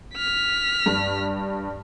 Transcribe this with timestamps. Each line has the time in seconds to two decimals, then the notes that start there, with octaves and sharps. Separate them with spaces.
0.15 F6 B6
0.86 G2